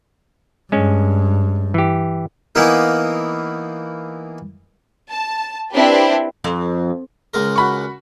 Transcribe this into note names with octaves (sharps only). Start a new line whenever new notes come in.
G2 G#3 C#4
E3 G4
E3 A#3 B3 D#4 E4 A#4
A5
C4 D4 E4 G4 B4
F2
C#2 G#3 A#4
F#4 B5 C#6